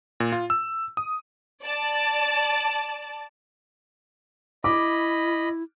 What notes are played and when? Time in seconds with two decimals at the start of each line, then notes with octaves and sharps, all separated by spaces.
0.20 A#2
0.32 F4
0.50 E6
0.97 D#6
1.63 D5 A5
4.64 E4 D#5 B5 D6